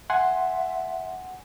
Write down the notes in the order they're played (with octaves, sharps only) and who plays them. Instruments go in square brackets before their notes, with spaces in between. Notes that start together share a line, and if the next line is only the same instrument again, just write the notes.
[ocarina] E5 [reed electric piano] F#5 G#5 C6